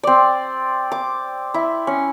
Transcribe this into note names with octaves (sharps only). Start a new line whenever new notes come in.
C4 D5
D6
E4
C#4